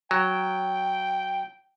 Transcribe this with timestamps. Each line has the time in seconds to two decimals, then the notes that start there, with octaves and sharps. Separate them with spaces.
0.11 F#3 G5